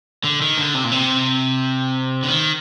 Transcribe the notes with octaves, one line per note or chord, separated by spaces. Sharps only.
D3
D#3
D3
C3
A#2
C3
D3
D#3